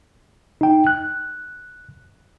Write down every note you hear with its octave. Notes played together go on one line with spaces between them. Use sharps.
D#4 G5
F#6